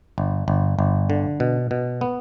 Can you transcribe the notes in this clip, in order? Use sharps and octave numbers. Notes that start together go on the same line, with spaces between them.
G1
G1
G1
D3
B2
B2
B3